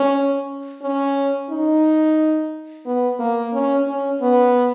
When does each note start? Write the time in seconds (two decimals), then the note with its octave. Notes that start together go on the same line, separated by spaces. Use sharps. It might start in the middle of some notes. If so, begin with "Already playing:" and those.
Already playing: C#4
0.82 C#4
1.50 D#4
2.86 B3
3.20 A#3
3.53 C#4
3.88 C#4
4.21 B3